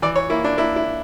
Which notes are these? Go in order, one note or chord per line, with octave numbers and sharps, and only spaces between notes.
E3 D5
C#5
A#3 E4
D4
A#3 E4
E4